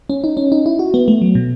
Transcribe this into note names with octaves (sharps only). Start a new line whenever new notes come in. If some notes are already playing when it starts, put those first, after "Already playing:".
C#4
D#4
C#4
D#4
E4
F#4
B3
A3
F#3
B2